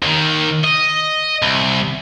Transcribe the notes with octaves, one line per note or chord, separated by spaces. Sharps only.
D#2 D#3
D#5
C2